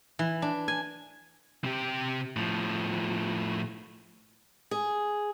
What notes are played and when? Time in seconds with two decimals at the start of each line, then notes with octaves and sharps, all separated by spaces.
0.19 E3
0.42 D4
0.68 G#5
1.64 C3 G4
2.36 A2 F3
4.71 G#4